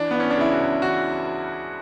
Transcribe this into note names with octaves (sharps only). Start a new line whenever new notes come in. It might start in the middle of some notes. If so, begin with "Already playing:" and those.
Already playing: E3 D4
E3 B3
C#4
D4
C#3 E4
F#4
C#2
E3 F#4